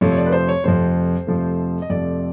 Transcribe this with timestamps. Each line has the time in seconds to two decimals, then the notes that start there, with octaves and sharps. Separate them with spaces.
0.01 F2 C3 F3 A3 C#5
0.12 C#5
0.17 D5
0.26 B4
0.32 C5
0.49 C#5
0.64 F2 C3 F3 A3 C5
1.27 F2 C3 F3 A3
1.82 D#5
1.90 F2 C3 F3 A3 D5